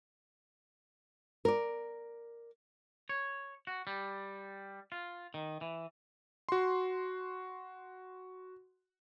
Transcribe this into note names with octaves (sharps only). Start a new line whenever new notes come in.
A#4 D5
C#5
F#4
G3
F4
D#3
E3
F#4 C6